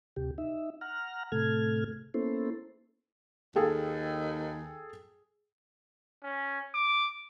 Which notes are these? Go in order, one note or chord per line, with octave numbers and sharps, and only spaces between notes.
D2 C3 G4
D#4 E5
F#5 A#5 F6
A2 C3 A3 A4 F6 G#6
A#3 B3 C#4 E4 A4 C5
D#2 G#4 A4 G5
C#4
D6